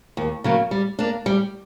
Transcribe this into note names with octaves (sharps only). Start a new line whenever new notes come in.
D#2
C#3 F#3 A#3
G3
A#3 D4
G3